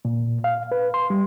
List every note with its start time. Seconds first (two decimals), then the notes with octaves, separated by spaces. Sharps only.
0.05 A#2
0.44 F5
0.72 B4
0.94 C6
1.10 G3